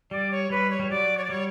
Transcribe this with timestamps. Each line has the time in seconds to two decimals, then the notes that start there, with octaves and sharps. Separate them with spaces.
0.11 G3 D5
0.31 C#5
0.50 G3 B4
0.70 C#5
0.80 G3
0.90 F#3 D5
1.17 C#5
1.24 D5
1.30 G3 C#5